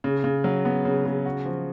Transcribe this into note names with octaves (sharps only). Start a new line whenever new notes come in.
C#3
C#3
F#3
B3
C#3
C#3
F#4
F3